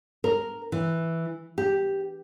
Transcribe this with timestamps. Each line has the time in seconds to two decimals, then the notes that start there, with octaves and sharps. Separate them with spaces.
0.24 A#4
0.72 E3
1.58 G4